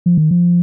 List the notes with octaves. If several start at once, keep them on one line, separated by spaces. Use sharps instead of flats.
F3
D#3
F3